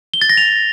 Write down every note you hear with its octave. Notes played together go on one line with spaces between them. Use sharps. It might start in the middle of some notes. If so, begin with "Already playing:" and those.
G7
A6
A#6
F7